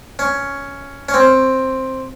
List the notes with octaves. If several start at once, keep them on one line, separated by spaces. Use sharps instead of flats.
C#4
C#4
C4